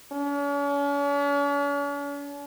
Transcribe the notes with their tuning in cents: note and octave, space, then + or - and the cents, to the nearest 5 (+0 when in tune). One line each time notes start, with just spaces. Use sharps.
C#4 +45